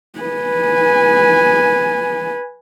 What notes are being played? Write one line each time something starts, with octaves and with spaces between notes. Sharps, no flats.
B4 G#5